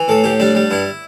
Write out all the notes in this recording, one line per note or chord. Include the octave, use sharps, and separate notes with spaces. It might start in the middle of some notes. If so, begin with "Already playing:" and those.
Already playing: E3
A2 A4
A2 G4
G3 D4
G3
G2 E4